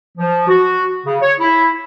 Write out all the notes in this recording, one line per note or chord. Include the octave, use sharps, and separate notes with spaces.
F3
F#4
C#3
C#5
E4